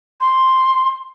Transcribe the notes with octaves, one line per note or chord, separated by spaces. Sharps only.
C6